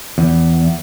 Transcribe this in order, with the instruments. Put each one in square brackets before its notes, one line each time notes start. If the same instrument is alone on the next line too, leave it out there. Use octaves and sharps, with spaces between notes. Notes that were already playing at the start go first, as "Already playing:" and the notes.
[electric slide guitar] E2